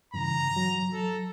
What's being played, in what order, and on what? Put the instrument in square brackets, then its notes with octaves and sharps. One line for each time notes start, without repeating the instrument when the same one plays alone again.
[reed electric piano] G2 C#3 E3 [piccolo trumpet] A#5
[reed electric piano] F#3
[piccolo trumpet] A4